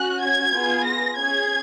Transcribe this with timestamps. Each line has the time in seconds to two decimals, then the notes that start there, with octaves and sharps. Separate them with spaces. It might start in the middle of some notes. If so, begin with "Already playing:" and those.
Already playing: C#4 F#4 F#6
0.22 G#6
0.53 B3 F4 G#4
0.85 A#6
1.17 C#4 G#4 G#6